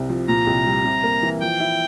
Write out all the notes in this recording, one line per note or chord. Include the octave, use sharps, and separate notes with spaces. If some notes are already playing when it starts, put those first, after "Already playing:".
Already playing: C2 C3
F3
A#2 A#5
C2
G3
C3
A#3
E3
F3 G5
E4